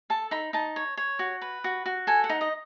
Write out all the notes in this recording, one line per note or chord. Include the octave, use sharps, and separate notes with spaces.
A4 A5
D#4 B5
D#4 A5
C#5
C#5
F#4
B4
F#4
F#4
A4 G#5
F#5
D#4
D#5